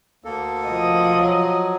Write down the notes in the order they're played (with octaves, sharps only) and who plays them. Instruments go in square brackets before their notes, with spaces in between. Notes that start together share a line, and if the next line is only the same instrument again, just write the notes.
[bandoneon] D2 A#3 A4
[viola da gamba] F3 D#5
[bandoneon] F#3